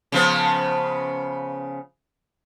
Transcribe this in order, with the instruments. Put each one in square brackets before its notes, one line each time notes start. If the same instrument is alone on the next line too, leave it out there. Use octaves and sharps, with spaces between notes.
[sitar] C#3 F3 B3